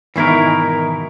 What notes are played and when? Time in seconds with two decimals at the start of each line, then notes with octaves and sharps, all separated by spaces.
0.16 G#2 B2 D#3 E3 E4 A#4